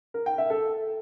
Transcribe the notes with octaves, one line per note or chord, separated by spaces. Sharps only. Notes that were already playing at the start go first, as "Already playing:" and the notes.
A#4
G5
E5
A4